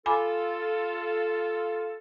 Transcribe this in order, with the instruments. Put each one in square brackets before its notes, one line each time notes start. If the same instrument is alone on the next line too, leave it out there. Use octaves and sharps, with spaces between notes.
[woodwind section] F4 A4 [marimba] G#5 B5 D6